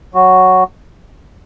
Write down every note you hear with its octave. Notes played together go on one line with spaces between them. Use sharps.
F#3 F#4